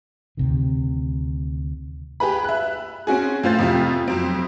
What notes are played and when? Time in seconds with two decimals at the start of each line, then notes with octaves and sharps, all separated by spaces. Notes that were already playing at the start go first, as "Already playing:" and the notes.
0.37 D2 C3 D#3
2.20 G4 G#4 B4 B5
2.44 E5 F#6
3.07 C4 C#4 F#4 G#4
3.43 A2 F4 C5 A6
3.59 F2 C3 A3 F4
4.08 F2 F#3 C4